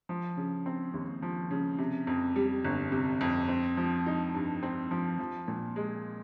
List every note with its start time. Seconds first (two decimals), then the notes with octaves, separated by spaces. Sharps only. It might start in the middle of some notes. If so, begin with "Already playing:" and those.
0.09 F3
0.37 C#3
0.66 C4
0.94 D#2
1.22 F3
1.51 C#3
1.79 C3
2.07 F2
2.36 G3
2.64 G1
2.92 C3
3.21 F2
3.49 C4
3.77 F3
4.06 D#4
4.34 G2
4.63 C4
4.91 F3
5.19 F3
5.48 A#2
5.76 G#3